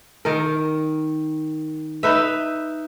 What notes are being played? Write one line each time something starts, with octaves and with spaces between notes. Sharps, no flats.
D#3 A#4
D#4 B4 E5